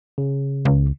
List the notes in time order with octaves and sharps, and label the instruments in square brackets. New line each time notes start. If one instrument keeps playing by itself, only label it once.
[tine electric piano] C#3
[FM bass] C#2